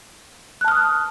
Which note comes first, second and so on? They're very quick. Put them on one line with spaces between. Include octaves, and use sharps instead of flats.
F#6 A5 F6 D#6